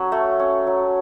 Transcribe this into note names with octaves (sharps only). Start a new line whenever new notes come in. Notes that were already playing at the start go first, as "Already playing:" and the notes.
Already playing: F#3 C#4 A4
A3
C#4
F#3